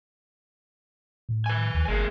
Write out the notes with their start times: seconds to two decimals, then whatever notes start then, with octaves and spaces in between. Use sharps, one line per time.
1.29 A2
1.46 B4 G#5
1.74 D#2
1.88 G1 G#3 A#3